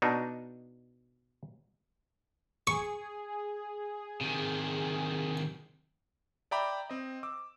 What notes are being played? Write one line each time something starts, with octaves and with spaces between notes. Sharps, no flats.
B2 D4 D#4
G#4 C#6
C3 D#3
D5 E5 G5 A#5 B5 D6
C4 D#5
D6 E6